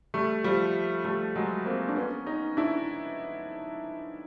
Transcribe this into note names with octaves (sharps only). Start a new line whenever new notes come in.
G3 A3
F3 G3
G3 A3
F#3 G#3
A#3 C4
D4
B3 C#4
C#4 D#4
D4 E4